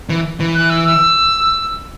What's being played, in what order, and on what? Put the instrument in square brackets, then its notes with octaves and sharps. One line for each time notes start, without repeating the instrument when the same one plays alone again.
[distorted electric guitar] E3
E3
[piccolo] F#6
E6
E6